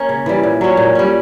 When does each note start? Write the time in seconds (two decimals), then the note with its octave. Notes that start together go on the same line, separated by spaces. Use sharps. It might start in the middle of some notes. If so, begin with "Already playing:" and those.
Already playing: A#3 C#4
0.09 C#3
0.26 E3 G3
0.44 A#2
0.61 F#3 C#4
0.77 A#2
0.95 G3 C#4